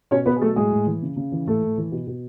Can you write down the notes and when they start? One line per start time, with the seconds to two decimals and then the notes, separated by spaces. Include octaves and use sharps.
0.11 B2 C#4 C#5
0.26 B2 B3 B4
0.36 G#4
0.41 F#3 A3 A4
0.56 A2 G#3 G#4
0.71 A2
0.86 E3
1.02 C#3
1.16 C#3
1.32 E3
1.47 A2 A3 A4
1.63 A2
1.78 E3
1.92 B2
2.07 B2